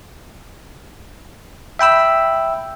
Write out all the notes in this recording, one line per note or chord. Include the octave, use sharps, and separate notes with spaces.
E5 G5 B5 E6